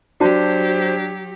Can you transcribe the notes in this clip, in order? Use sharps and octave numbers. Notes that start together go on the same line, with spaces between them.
F#3 D4 F#4 G4 C5 A5